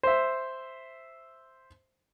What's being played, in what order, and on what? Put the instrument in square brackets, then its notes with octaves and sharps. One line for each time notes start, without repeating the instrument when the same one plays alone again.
[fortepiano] C5 E5